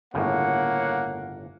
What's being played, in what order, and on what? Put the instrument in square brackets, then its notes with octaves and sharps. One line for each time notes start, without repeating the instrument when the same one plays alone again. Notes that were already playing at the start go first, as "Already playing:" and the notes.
[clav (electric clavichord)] G1 A2 C#3 [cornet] A#3 [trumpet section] C#5 F#5